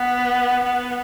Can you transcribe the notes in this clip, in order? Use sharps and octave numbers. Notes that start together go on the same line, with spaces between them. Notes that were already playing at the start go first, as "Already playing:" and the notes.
Already playing: B3
B3